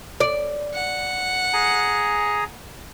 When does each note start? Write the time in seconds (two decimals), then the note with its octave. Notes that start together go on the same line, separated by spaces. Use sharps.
0.20 D5
0.74 F#5
1.53 G#4 G#5 A#5